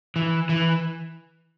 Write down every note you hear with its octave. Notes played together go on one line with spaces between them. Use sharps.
E3
E3